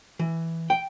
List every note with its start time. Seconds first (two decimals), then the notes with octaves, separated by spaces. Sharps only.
0.19 E3
0.70 G5